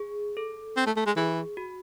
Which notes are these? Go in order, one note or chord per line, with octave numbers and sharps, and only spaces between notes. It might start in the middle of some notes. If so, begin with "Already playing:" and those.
Already playing: G#4
A4
C4
A3
A3
G#3
E3 G#4
F#4